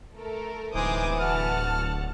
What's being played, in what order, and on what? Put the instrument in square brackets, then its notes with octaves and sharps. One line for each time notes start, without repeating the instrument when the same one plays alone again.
[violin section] A3 A4 A#4
[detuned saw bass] D1 [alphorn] E3 [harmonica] G#3 D#4 G#4 [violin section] C5 D6 D#6
[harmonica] F#4 F6 [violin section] F#5 A5